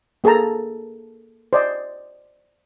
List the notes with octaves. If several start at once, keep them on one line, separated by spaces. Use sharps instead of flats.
A#3 G#4 A4 A5 A#5
C5 D5 D#5